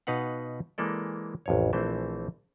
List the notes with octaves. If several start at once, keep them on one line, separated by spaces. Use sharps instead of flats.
B2 D#4 B4 F5 F#5
E3 G#3 A#3 A4 D5
A1 F2 C#5
A#1 E3 A3 C4 C5